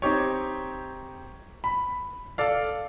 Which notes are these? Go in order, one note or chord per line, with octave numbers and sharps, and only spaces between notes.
C4 D#4 G4 C#5
B5
A4 D5 F5